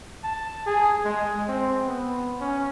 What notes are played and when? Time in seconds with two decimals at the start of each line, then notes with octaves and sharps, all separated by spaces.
0.24 A5
0.66 G#4
1.05 G#3
1.48 C4
1.86 B3
2.41 C#4